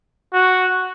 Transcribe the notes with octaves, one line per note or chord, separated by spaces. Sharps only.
F#4